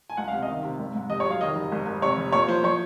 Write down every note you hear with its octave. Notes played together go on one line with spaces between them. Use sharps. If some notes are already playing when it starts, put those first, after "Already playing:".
G#5
C#2 F#5
F5
C3
D#5
D#3 F5
C3
G#1
G#2
F1 D#5
C#5
F#3
F5
D#3 D#5
F1
G#1
G#1
C3 C#5
F1
A#2 C#5
F3 C5
F3 C#5